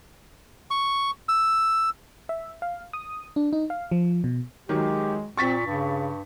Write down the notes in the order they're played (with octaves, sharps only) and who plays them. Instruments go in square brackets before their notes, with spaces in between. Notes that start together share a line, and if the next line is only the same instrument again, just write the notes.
[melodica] C#6
E6
[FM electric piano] E5
F5
D#6
D4
D#4
F5
F3
B2
[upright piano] D#3 F#3 [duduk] G#3 [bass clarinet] G4
[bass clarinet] A#2 [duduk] C4 [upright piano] C#6 A6 B6
[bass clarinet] G2 [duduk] C#3